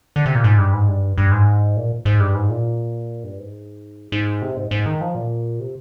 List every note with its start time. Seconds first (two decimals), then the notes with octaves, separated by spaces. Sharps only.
0.16 D3
0.26 C3
0.35 A#2
0.44 G#2
0.58 G2
0.73 G#2
0.88 G2
1.18 G2
1.32 G#2
1.77 A#2
2.05 G#2
2.20 G2
2.35 G#2
2.50 A#2
3.24 G2
3.38 G#2
4.12 G#2
4.42 C3
4.57 G#2
4.71 G#2
4.86 D#3
5.01 F3
5.15 A#2
5.60 C3